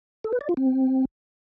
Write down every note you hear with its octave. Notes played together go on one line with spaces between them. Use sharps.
A4
B4
D5
F4
C4